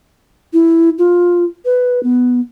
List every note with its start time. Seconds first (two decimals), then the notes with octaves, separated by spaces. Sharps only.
0.53 E4
0.98 F4
1.65 B4
2.03 B3